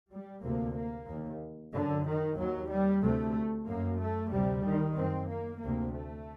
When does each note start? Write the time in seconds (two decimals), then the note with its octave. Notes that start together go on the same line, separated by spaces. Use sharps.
0.11 G3
0.43 D2 C3 A#3
0.77 A#3
1.08 D#2
1.73 F#2 D3
2.05 D#3
2.37 D#2 F#3
2.69 G3
3.03 D2 C3 A3
3.67 F#2 A#3
4.00 A3
4.32 D2 C3 G3
4.64 D#3
4.96 F#2 C4
5.28 A#3
5.61 D2 C3 A#3
5.93 A3